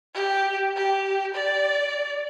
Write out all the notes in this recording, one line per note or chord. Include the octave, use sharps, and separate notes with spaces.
G4
G4
D5